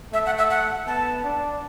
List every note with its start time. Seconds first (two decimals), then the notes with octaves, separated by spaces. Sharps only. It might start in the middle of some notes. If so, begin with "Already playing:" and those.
0.12 A3 E5
0.26 F#5
0.38 E5
0.51 F#5
0.87 B3 A5
1.24 D4